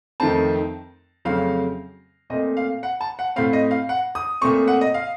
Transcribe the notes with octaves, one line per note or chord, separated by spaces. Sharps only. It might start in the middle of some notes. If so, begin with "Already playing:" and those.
F2 D#3 A3 C4 A5
F2 C#3 F#3 A3 C4 F5
A#2 A3 C4 D#5
F5
F#5
A5
F#5
A2 A3 C4 F5
D#5
F5
F#5
D#6
A#2 A3 C4 C#6
F#5
D#5
F5